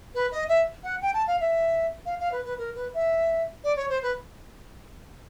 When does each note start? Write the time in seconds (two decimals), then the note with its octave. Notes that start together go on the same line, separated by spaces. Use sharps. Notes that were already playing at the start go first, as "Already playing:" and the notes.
0.15 B4
0.32 D#5
0.49 E5
0.84 F#5
1.02 G5
1.14 A5
1.27 F5
1.40 E5
2.06 F5
2.20 F5
2.32 B4
2.45 B4
2.58 A#4
2.75 B4
2.94 E5
3.64 D5
3.77 C#5
3.89 C5
4.02 B4